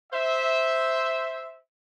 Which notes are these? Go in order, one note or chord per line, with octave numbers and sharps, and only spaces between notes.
C5 E5